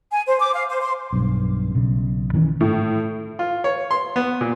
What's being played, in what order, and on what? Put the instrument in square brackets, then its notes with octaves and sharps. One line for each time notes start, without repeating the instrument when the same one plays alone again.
[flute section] G#5
C5
D6
F5
C5
C6
[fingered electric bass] B1 G2
B1 C#3
D#3 E3 G3 C#4
[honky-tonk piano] A2
[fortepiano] F4
C#5
C6
B3
A#2